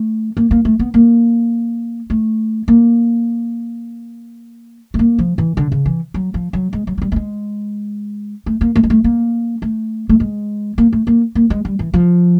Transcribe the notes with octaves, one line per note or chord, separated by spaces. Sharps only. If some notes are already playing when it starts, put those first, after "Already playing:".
Already playing: A3
A#3
A#3
A3
B3
A#3
A3
A#3
A3
A#3
F3
E3
D3
C#3
E3
F#3
F3
F#3
G#3
F#3
F#3
G3
A3
G#3
A3
A#3
A3
G#3
A3
A#3
A3
A3
G#3
A#3
A3
A#3
A#3
G#3
G3
E3
F3